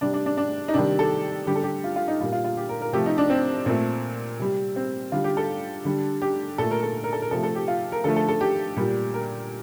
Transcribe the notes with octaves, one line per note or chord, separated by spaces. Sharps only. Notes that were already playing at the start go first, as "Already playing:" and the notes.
C3 G3 D4
D4
D4
D4
D#4
C3 D#3 G3 D4
A4
D3 G3 G4
A4
G4
F4
F4
D#4
A#2 G3 F4
F4
F4
G4
A#4
A#4
C3 F3 A3 G4
D#4
D4
C4
A#2 A3 C4
C3 G3
C4
D3 G3 F4
G4
A4
D3 G3
G4
A#2 A3 A4
A#4
A4
A#4
A4
A#4
C3 F3 A3 A4
A4
G4
F4
A#4
D3 F3 A3 A4
A4
A4
G4
A#2 G3
A#4